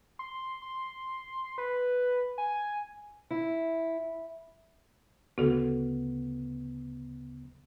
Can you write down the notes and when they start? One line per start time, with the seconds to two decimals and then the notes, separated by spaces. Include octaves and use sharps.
0.19 C6
0.62 C6
1.58 B4
2.38 G#5
3.31 E4
5.38 D2 C#3 B3 F#4 A4